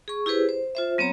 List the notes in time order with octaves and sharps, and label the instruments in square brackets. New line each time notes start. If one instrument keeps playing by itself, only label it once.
[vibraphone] G#4 C#6
E4 G4 G#4 B4 C5
C5
F4 C5 E5
F#3 B3 C4 C#5 A#5